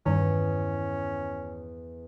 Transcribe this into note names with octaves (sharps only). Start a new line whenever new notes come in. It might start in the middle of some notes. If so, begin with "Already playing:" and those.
E2 G2 D#3 C#4